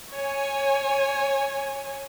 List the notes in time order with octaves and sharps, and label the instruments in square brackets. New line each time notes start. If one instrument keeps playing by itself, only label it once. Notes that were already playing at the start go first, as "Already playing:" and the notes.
[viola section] C#5 G#5